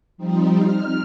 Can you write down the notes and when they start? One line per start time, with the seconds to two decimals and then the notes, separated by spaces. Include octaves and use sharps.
0.17 F3 G3 C4 D#4
0.62 F6